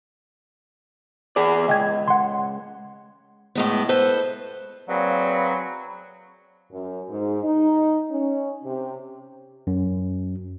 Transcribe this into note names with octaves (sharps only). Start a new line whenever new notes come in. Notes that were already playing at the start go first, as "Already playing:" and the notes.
E2 G#4 D5
C#2 D#5 G5 G#6
F#5 C6
A2 G#3 B3
A4 B4 C5
F#3 A#3 C4 G#4 B4 D5 F5 B5
F#2
G#2
D#4
C#4
C3
F#2